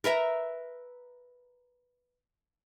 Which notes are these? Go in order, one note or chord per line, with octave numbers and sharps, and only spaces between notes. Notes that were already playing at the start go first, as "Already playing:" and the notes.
A#4 B4 E5 A#5